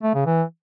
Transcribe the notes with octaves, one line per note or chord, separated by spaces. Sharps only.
A3
C#3
E3